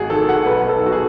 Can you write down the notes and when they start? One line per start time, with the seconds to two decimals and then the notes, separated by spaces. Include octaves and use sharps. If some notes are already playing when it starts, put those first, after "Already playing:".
Already playing: G#1 F#4 G#4
0.10 D#3 A4
0.29 F#5
0.46 B1 B4
0.69 A4
0.81 B1
0.87 F#4
0.92 G#4